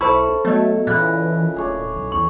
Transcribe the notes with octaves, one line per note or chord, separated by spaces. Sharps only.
B1 E4 A4 C5 B5 C#6
F#3 A3 B3 D#5
A#2 C#3 E3 E4 D#5 F#6
D1 G#4 C#5 D5
B1
E2 C#6